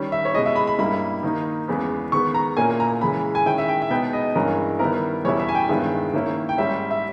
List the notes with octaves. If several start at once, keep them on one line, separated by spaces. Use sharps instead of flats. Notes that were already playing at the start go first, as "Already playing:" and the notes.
Already playing: D#3 G3 C#4
E5
C#5
B2 G#3 C#4 E4 D#5
E5
B5
B5
G2 G3 A#3 E4 B5
D#3 A#3 D#4
E2 C#3 G#3 B3
D#3 G#3 B3 C#6
A#5
A#2 A#3 C#4 E4 G#5
A#5
C#3 E3 G#3 B5
G#5
D#3 G#3 C#4 E4 G5
E5
G5
E5
B2 G#3 B3 D#4 G5
D#5
G2 E3 G#3 C#4 A#4
D#3 G3 B3 E4 A#4
E2 B2 G3 C#4 E4 C#5
E5
G#5
G5
G2 D#3 G#3 B3 E4
D#3 A#3 C#4 E4
G5
G#2 G3 C#4 E5
E5